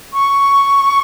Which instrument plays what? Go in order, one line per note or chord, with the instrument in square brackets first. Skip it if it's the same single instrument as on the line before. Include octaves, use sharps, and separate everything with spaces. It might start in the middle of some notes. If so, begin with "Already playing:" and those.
[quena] C#6